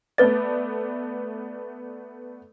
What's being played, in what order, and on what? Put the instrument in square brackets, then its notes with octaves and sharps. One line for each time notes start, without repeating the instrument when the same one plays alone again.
[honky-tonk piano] A3 B3 D5 [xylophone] B4 A6